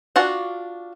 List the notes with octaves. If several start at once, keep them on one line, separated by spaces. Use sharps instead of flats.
D4 F4 F#4 F#5